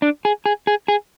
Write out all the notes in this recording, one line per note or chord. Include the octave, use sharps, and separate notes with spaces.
D4
G#4
G#4
G#4
G#4